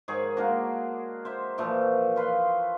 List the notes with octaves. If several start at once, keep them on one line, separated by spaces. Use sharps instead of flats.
G#2 D#3 G#4 C#5
G#3 A#3 D4 F#4
C5 E5
A#2 E3 F3 A3
F4 B4 C6